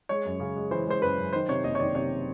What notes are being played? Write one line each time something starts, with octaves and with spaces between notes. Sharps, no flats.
G#3 C#5
F#2
C#3
G#3
E3 C5
G#3 C5
F#2 B4
F#2
D#3 C5
C3 C#5
F#1 D#5
C#5
D#3 D5
C3 C#5